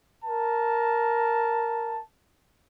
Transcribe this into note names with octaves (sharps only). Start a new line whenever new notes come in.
A#4 A5